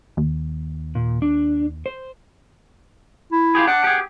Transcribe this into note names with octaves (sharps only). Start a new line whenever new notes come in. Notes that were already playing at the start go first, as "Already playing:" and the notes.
D#2
A#2
D4
C5
E4
F4 G4 G#4
D4 F#5
G4 G#4